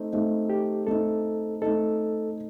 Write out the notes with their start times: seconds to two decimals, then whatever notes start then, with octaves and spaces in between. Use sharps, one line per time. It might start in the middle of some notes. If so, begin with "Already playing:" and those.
Already playing: A3 C4 D#4
0.13 A3 C4 D#4
0.50 G4
0.87 A3 C4 D#4 A4
1.62 A3 C4 D#4 A4